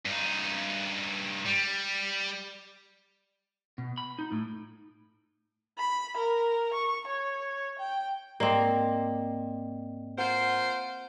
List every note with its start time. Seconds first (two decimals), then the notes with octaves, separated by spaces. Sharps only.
0.05 G2 D#4
1.46 G3
3.78 B2
3.98 B5
4.19 D#4
4.32 A2
5.79 B5
6.17 A#4
6.74 C#6
7.07 C#5
7.79 G5
8.40 G#2 A#3 C4 D5 D#5
10.18 F4 A#4 C5 F#5